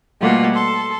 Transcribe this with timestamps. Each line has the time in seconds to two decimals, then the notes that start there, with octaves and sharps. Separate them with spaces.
0.21 B2 G3 A3 A#3 F4 F#5
0.55 A4 C6